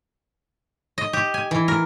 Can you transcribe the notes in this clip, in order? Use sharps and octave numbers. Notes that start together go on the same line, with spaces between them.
D#5
G4
G#5
E3
A#4